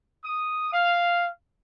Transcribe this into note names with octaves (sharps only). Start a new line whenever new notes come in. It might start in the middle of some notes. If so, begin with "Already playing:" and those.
D#6
F5